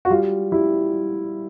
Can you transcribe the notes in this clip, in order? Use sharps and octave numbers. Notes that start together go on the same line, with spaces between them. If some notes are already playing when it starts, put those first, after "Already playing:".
F#4
G3 F4
G3 E4